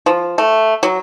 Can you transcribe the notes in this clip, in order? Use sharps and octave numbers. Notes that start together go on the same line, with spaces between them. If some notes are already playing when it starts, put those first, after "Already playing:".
F3
A3
F#3